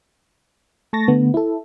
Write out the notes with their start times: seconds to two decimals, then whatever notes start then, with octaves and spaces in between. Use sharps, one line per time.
0.93 A3 A5 C#6 A6 A#6
1.08 D3 A3 B3
1.34 E4 A4